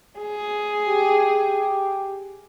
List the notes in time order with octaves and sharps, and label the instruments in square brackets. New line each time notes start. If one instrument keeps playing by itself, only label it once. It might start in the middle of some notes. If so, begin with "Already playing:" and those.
[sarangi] G#4
[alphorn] G4